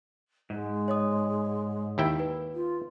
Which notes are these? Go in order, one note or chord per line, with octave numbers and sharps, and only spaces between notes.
G#2 G#3
C#5 D#5 D#6
D#2 E4 G5
B4
F4